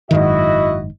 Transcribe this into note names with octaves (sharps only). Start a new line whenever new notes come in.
F#1 G#2 D#3 E4 F#4 D#5